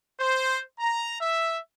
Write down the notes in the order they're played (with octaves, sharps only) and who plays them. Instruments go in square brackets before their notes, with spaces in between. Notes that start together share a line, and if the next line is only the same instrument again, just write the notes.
[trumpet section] C5
A#5
E5